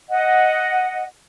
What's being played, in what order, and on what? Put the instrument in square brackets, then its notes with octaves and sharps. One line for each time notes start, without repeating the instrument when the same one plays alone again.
[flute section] D#5 F#5